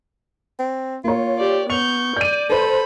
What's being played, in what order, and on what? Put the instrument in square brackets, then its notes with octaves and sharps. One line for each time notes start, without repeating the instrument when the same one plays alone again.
[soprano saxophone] C4
[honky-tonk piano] A#3 C#5 [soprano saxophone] F4
[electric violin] G4 D5
[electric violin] B3 G6 [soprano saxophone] C#6 [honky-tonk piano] F7
[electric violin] D5 [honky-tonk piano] G6 D#7
[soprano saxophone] A4 [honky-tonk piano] B4 C5 [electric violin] B5